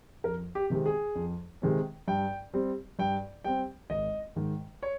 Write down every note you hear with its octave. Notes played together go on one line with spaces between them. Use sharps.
F2 A#4
G4
C3 D#3 G#3 C4
G#4
F2
C3 D#3 G#3 C4
G2 G5
G3 C4
G2 G5
G3 C4 G5
G#1 D#5
G#2 D#3
C#5